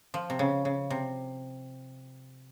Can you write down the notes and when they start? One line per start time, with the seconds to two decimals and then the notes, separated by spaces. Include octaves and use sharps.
0.14 F3
0.30 C3
0.39 C#3
0.65 C#3
0.90 C3